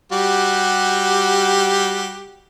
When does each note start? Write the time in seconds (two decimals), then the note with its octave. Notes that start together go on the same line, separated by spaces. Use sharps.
0.12 G3 F#4 G4